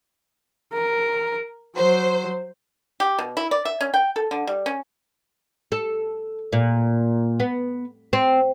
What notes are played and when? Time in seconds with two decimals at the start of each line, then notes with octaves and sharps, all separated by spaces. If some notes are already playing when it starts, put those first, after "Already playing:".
0.73 A#4
1.76 F#3 C5
3.00 G4
3.19 B2
3.37 E4
3.51 D5
3.65 E5
3.81 C#4
3.94 G5
4.16 A4
4.31 D3
4.47 G3
4.66 C#4
5.72 A4
6.53 A#2
7.40 B3
8.13 C4